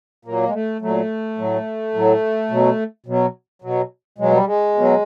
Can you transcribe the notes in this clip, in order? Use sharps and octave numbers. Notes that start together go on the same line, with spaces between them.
A#2 F#3 A#3
G#3
A3
A#2 F#3 A3
A2 F#3
A2 F#3
B2 F#3
B2 F#3
B2 F#3
B2 F#3 G#3
G3
G#3
B2 F#3